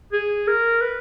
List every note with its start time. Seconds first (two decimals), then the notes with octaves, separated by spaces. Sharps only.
0.13 G#4
0.47 A#4
0.81 B4